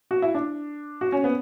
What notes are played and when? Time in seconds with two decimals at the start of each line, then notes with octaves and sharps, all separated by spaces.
0.11 F#4
0.22 E4
0.35 D4
1.01 F#4
1.12 C#4
1.24 B3